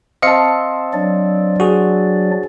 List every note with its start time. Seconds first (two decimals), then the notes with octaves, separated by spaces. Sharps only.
0.22 C4 D#5 F5 A5 C#7
0.93 F#3 D4 D5
1.60 F#4 G#4